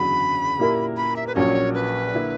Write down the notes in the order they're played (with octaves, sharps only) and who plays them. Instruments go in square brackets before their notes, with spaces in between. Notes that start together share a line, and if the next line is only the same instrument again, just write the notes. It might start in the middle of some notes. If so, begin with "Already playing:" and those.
Already playing: [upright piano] F#1 E2 D3 F#3 [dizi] B5
[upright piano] A#2 A#3 E4 G4 A#4
[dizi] B5
E5
B4
[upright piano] A#1 A#2 F#3 C#4 [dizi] C#5
[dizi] B4
[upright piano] D3 A#3 E4